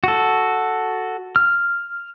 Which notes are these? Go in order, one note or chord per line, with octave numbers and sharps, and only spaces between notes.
F#4 A4
F6